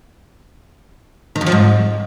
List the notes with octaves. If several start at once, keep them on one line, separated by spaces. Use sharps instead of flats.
D#3
F2
F3
G#2